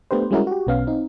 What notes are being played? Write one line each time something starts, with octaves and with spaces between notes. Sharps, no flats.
A3 B3 D4 G4 B4 C5
G3 G#3 C#4 E4 F#4 A#4
F#4 G4
B1 B2 B3 C#4 F5
C4 D#4